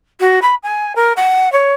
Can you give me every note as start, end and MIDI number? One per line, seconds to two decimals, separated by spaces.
0.20 0.39 66
0.42 0.55 83
0.63 0.93 80
0.96 1.13 70
1.16 1.51 78
1.52 1.74 73